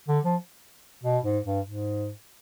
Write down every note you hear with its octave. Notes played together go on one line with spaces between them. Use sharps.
D3
F3
B2
G#2
G2
G#2